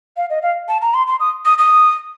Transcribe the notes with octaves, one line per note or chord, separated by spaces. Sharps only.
F5
D#5
F5
A5
A#5
C6
C6
D#6
D#6
D#6